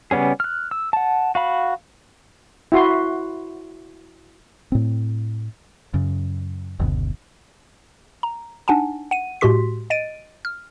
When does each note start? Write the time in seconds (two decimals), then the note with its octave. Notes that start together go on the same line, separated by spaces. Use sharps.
0.11 C#3 G3 B3 C#4 G#4
0.40 F6 F#6
0.71 E6
0.93 F#5 A5
1.35 F#4 F5 B5
2.72 E4 F#4 C6
4.72 A2 C4
5.94 F#2 C#3
6.80 F#1 D2 B2
8.23 A#5
8.68 D4 D#4 F#5 G#5 A5
9.11 F#5 D#7
9.41 A2 G#3 F#4 G4 C6 B6
9.90 D#5 A6 D7 D#7
10.45 F6